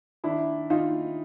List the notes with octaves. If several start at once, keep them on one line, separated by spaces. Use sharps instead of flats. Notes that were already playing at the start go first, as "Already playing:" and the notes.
D#3 D4 E4
D#3 D#4 F4